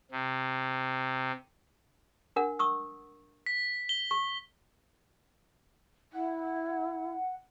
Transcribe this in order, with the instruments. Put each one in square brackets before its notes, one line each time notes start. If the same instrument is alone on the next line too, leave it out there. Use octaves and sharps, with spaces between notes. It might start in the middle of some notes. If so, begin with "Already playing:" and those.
[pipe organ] C3
[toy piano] D4 A#4 F#5
C#6 D#6 E6
[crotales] B6
G7
[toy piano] C#6
[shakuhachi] E4 [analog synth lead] F#5